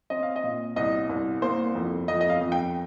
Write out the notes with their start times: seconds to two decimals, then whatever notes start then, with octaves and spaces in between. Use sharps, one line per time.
0.10 C4 D#5
0.23 F5
0.36 D#5
0.43 A#2
0.76 C2 D#5
1.09 C2
1.42 A#3 C5
1.75 F2
2.08 F2 D#5
2.21 D#5
2.30 F5
2.41 F2
2.52 G5